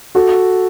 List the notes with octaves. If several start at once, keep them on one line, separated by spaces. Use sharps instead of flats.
F#4 A4